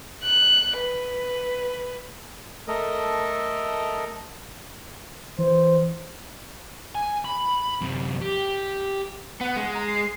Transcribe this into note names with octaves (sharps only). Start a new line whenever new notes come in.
F#6
B4
A3 A4 A#4 D#5
E3 C5
G#5
B5
F#2 C3
G4
B3 F#5
G#3
A#5
C7